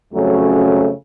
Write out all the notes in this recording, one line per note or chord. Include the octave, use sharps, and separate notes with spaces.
F2 C#3 F#3 A3 C#4